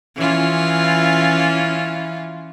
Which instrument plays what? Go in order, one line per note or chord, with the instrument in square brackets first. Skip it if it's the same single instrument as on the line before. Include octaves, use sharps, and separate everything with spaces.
[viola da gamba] E3 C#4 F4